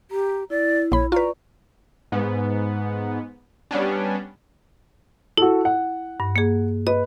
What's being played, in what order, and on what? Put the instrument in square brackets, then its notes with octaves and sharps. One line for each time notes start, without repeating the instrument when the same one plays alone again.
[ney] G4 [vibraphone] A#5
[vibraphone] E4 [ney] D5
[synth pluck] A#1 B5 [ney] C#5
[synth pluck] F4 B4 [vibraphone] D5 C#6 [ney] A#5
[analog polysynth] G#2 B3
G3 B3 C#4 D4
[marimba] E4 [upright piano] F#4 A4
[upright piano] F#5
[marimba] G2
A#3 G#4
[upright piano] B4 [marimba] D#5